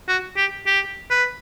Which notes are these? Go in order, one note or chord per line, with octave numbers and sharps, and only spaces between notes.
F#4
G4
G4
B4